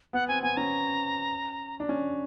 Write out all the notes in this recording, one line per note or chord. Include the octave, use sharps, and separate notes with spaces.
B3 F#5
C4 G#5
B3 G#5
C#4 A#5
D4
C#4